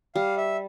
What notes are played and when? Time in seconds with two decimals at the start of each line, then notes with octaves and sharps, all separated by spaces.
0.15 G3 F5
0.37 E5